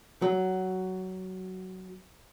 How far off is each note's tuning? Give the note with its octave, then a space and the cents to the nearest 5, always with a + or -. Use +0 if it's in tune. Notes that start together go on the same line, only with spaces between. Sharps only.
F#3 +10